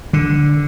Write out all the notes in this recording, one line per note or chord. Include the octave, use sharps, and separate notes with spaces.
D3